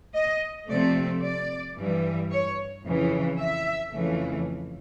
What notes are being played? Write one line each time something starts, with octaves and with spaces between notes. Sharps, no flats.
D#5
C3 F3 A3 C4 D5
D5
G2 E3 G3
C#5
F2 C#3 E3
E5
F2 C#3 E3 A3